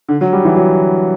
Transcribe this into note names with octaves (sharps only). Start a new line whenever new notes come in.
D3
F#3
G3
E3
F#3